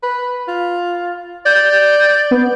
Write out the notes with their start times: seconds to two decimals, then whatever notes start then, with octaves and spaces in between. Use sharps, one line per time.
0.03 B4
0.48 F4
1.46 D5 G6
2.31 B3